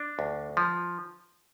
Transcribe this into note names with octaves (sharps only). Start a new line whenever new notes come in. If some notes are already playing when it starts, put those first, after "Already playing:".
Already playing: D4
D2
F3